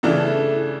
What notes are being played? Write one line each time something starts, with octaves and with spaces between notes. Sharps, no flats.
C#3 E3 A3 D4 E4 A4